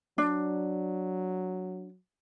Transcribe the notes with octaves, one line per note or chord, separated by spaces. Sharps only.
F#3 D4